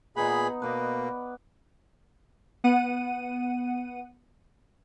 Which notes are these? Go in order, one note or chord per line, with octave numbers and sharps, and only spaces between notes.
A#2 B3 D#4 G#4 A#5 B5
B2 A#3 B4 D5
B3 F#5 D#7